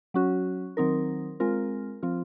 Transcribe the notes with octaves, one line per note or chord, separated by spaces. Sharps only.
F#3 C#4 F#4
D#3 F#3 C4 D#4 A#4
G#3 C4 F4 A#4
F3 C4 F4